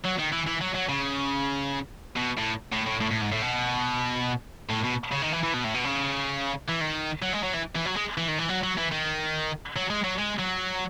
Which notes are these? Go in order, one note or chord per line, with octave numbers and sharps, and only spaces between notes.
F#3
D#3
E3
E3
F#3
F#3
C#3
B2
A2
A2
A2
A2
A2
G#2
A2
B2
A2
B2
C#3
D#3
E3
E3
B2
A2
B2
C#3
E3
D#3
F#3
G#3
F#3
E3
E3
F#3
G#3
E3
D#3
E3
F#3
F#3
E3
D#3
F#3
G#3
F#3
G#3
F#3